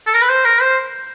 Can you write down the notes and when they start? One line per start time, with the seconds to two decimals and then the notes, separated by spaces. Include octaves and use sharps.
0.07 A4
0.14 A#4
0.22 B4
0.29 C5
0.45 A#4
0.61 C5